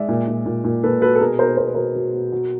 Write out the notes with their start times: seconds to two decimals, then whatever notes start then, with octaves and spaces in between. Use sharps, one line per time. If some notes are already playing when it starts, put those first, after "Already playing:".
Already playing: G#3 D5 E5
0.09 A#2
0.27 A#2
0.46 A#2
0.64 A#2
0.83 A#2 A4 B4
1.01 F#3 A4 B4
1.16 A4
1.20 B2 G#4 A#4
1.38 B2 A#4 C5
1.57 B2 C5
1.67 B4
1.74 F#3 A#4 C5
1.95 F#3
2.14 B2
2.32 F#3